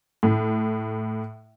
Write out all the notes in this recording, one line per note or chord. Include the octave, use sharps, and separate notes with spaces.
A2